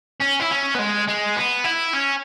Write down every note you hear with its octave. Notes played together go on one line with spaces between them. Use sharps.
C#4
E4
C#4
B3
G#3
G#3
B3
E4
C#4